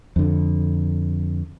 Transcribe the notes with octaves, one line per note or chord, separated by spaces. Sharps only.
F2 D3